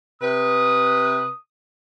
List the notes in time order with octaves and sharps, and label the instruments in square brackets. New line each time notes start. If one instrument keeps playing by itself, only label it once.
[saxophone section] C3 B4 [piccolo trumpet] D#6